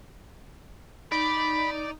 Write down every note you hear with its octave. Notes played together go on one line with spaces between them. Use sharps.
D#4 D5 B5